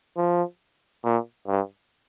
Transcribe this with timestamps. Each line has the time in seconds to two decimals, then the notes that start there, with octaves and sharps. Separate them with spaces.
0.17 F3
1.04 A#2
1.47 G2